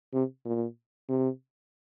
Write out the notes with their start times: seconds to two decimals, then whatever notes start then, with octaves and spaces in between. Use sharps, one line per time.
0.13 C3
0.45 A#2
1.09 C3